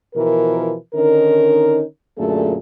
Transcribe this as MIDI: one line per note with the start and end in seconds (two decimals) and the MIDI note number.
0.15 0.74 47
0.15 0.74 52
0.15 0.74 53
0.15 0.74 70
0.94 1.82 50
0.94 1.82 51
0.94 1.82 61
0.94 1.82 63
0.94 1.82 70
2.18 2.56 42
2.18 2.56 46
2.18 2.56 50
2.18 2.56 57
2.18 2.56 68
2.18 2.56 69